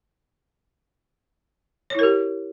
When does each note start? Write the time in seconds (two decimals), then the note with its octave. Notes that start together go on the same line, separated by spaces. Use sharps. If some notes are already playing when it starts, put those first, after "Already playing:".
1.90 C#5
1.95 E4
1.99 A#4
2.03 G4